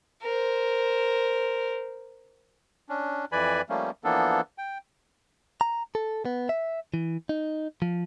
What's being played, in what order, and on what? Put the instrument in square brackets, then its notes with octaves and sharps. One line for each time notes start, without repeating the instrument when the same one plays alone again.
[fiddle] A#4 C5
[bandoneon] C#4 D4
F2 E3 B4 D5 G#5 B5
F3 G3 A3 A#3 C#4
E3 F3 A#3 B3 D4 A4
G5
[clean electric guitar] A#5
A4
B3
E5
E3
D#4
F3